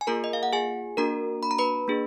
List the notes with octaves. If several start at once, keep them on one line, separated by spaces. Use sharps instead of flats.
G#5
A#3 F4 G#4 A#4 A#5
D#5
F5
F#5
G#4 G#5
A#3 D4 F#4 A#4 A#5
B5
A#5
B4 B5
A#3 D4 G#4